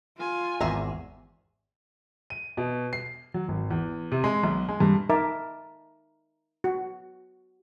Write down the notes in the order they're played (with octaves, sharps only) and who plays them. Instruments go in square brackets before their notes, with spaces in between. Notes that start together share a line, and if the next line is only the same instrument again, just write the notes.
[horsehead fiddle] F4 G#5
[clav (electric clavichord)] G#1 E2 [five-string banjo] G#4 E5 A#5
[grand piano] D#7
B2
C7
F#3
G#1
E2
C3
G#3
B1
G#3
G2
[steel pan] D#4 A#4 E5 A5 D6
F#4